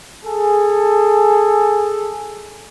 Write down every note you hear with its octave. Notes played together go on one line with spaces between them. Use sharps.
G#4 A4